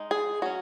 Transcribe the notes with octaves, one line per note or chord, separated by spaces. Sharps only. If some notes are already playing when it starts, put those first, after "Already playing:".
Already playing: G#3 D#4
G#4
F#3 C#4 F#4